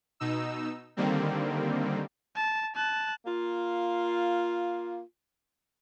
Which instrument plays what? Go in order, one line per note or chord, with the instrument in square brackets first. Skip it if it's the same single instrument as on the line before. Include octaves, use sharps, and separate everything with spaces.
[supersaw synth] B2 D#4 E6
D3 D#3 G3 A#3 C4
[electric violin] A5
A5 F#6
[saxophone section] A#3 F4